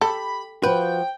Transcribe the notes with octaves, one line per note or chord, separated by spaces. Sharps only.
G4 A4 B5
F3 F4 F#4 B4 G5